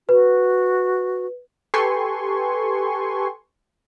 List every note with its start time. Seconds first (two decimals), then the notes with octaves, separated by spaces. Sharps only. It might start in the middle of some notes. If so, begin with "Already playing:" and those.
0.09 F#4 B4
1.74 G4 A4 B4 G#5 C6 C#6